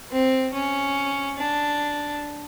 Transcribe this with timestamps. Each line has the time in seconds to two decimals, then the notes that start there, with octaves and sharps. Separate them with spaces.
0.11 C4
0.54 C#4
1.37 D4